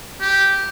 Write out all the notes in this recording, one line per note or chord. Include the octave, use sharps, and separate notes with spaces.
G4